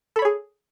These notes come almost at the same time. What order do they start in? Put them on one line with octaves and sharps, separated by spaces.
A4 B5 C#5 G#4